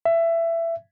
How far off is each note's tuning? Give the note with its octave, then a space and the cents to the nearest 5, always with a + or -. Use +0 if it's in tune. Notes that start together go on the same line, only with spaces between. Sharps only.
E5 +20